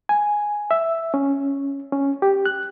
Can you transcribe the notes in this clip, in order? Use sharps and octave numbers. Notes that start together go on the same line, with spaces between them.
G#5
E5
C#4
C#4
G4
F#6